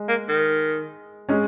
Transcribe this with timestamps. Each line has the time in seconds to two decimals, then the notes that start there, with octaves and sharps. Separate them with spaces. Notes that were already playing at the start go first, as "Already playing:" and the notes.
Already playing: G#3
0.08 A#3
0.28 D#3
1.29 G#3 C#4